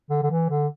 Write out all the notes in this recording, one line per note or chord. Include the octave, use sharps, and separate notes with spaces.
D3
D3
E3
D3